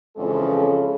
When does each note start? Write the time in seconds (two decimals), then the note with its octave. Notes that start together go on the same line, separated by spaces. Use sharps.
0.17 F2 C#3 E3 G#3 C4 A4